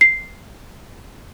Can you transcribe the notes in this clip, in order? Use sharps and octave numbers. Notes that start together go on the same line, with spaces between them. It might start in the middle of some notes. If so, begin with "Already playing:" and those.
C7